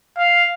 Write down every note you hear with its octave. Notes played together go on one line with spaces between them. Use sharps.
F5